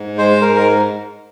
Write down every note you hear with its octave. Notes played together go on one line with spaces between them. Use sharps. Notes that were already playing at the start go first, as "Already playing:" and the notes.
Already playing: G#2
G#3 C5
G#2 A#4
A#4